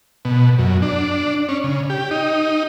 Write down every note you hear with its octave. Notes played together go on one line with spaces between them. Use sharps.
B2
F#2
D4
C#4
C#3
G4
D#4